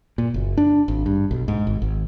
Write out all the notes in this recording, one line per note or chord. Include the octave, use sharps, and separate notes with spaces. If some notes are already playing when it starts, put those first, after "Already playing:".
A#2
F#1
D4
G#1
G2
B1
G#2
G#1
G#1